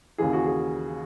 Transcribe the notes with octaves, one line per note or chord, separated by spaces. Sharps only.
D#2 C#3 E3 G#4
F#4
G#4